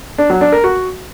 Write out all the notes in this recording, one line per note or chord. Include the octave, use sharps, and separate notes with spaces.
D4
F#3
D4
A#4
F#4